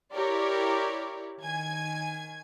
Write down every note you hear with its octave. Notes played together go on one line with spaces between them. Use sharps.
E4 G4 A#4 C#5 D5
D#3 G#5 G#6